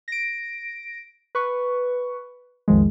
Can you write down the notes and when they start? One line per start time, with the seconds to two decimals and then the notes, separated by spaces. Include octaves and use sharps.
0.08 A#6 D7
1.35 B4 C#6
2.68 B1 F2 D#3 F3 G#3